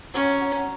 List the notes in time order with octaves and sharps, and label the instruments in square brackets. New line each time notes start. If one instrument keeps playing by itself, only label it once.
[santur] F#3 [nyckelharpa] C#4
[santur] F#3